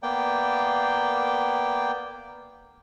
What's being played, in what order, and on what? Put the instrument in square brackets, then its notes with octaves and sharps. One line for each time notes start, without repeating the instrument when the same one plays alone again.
[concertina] A#3 B3 D5 G5